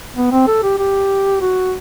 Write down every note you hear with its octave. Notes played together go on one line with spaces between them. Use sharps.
B3
C4
A4
G4
G4
F#4